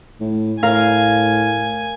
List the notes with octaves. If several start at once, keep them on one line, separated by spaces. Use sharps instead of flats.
A2
A2 A#4 F5 G#5